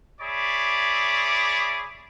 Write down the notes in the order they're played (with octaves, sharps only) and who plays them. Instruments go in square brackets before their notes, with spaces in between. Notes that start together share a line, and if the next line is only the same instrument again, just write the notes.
[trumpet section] G#4 C#5 D5 E5 B5 D6